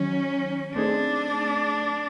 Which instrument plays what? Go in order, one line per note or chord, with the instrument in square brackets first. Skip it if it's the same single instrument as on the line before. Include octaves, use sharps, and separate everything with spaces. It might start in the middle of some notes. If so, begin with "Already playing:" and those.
Already playing: [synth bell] D#3 F#3 [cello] C#4
[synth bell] A3 C4 D#4 G#4 [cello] D4